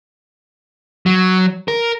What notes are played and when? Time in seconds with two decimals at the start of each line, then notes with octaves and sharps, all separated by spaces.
1.06 F#3
1.68 A#4